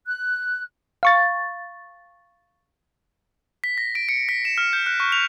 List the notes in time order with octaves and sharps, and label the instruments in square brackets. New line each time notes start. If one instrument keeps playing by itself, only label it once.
[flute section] F#6
[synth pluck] F5 C#6 A6
[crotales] B6
A#6
D7
C#7
B6
E7
F6
G6
F#6
C#6
F7